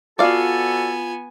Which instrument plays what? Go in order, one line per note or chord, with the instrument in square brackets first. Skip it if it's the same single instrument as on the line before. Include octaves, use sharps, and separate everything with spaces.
[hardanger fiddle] B3 G#5 [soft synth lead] F4 [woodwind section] F#4 A4 [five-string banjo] D5 F5